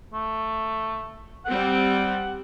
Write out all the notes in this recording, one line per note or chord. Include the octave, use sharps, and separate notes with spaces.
A3
G3 C4 F#5